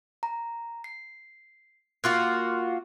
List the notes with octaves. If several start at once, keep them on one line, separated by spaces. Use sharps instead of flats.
A#5
C7
A#3 F4 F#4 C6 F6 F#6